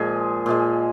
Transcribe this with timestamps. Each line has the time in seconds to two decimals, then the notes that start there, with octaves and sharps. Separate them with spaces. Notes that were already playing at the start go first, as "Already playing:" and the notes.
Already playing: A#2 F3 G#3 G#4
0.46 A#2 F3 G#3